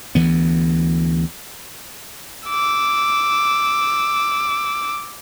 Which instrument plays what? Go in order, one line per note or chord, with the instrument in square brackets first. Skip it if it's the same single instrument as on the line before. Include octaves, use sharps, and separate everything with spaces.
[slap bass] D2 E3 B3
[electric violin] D6 E6